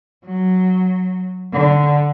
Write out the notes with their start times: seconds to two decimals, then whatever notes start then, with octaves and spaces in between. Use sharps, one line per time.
0.25 F#3
1.52 D3